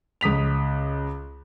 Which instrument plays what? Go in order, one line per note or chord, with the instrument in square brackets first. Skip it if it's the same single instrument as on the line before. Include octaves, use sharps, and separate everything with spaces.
[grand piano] C#2 D#6 B6 F7